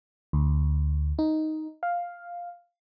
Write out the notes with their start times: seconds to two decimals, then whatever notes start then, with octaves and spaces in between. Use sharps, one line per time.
0.33 D2
1.19 D#4
1.83 F5